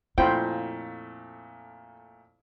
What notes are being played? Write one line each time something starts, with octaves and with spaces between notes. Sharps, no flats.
F2 A#2 A3 E4 F4 C5 G5 B5